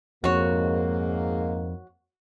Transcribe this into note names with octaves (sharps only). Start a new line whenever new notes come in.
F2 G#2 A#3 F#4 C#5